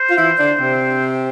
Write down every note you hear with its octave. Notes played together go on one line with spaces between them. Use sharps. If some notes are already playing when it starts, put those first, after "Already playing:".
Already playing: C5
F4
E3 E4
D3 D4
C3 C4